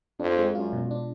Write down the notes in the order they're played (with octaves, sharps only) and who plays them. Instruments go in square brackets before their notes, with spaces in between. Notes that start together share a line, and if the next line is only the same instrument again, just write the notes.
[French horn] F2 [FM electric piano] D4
[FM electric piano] G#3
[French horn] F#2 [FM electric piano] F4
[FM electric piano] B2
D4